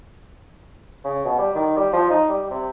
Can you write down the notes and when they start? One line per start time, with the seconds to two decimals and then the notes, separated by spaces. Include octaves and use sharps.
1.05 C#3
1.25 B2
1.39 G3
1.55 D#3
1.76 G3
1.93 F3
2.10 D#4
2.29 G3
2.50 C3